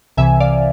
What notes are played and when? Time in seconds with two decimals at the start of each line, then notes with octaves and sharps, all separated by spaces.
0.17 C2 C3 E3 E5 G#5
0.40 D5 F5